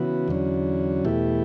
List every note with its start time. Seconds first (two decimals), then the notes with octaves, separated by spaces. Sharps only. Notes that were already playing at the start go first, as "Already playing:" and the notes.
Already playing: C#3 E3 B3 F#4
0.28 E2 D3 F#3 C#4
1.05 E2 B2 A3 E4 G4